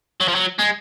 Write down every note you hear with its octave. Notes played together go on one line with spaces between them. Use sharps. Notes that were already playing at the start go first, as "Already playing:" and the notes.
F#3
F3
F#3
G#3